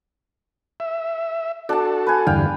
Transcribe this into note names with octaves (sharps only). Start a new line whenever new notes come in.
E5
D4 F#4 A4 A5
B4 G#5
E2 G2 D3 F5 G5